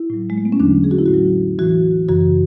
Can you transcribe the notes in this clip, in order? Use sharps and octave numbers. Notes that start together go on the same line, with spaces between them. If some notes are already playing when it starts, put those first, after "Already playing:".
Already playing: E4
A2 F#3
G#3
A3
B3
C#4
E2 D3 F#3 D4
G#4
F#4
E4
A2 F#4
F#3
A2 E3 F#4
F#2 C#3 E3 F#4